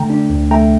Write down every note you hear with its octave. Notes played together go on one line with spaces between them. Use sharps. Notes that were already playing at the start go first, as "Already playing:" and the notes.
Already playing: D3 A3 G5 A#5
D4
D2
A3 G5 A#5